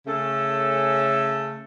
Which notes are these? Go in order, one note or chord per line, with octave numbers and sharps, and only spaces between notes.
C#3 A3 C#4 A4